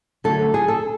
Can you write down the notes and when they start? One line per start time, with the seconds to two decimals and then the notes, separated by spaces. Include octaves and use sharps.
0.24 D3 F#3 A3 A4
0.54 G#4
0.68 A4